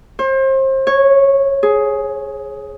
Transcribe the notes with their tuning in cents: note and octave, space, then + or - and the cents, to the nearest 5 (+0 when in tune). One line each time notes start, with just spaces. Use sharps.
C5 +35
C#5 -10
G#4 +10